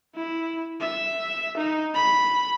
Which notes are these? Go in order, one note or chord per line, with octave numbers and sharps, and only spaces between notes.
E4
E5
D#4
B5